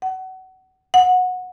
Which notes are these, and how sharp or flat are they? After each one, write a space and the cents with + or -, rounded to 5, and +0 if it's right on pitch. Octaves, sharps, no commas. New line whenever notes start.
F#5 +25
F#5 -20